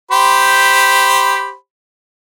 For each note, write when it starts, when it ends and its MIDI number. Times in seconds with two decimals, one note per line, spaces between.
0.11 1.54 67
0.11 1.54 72
0.11 1.54 83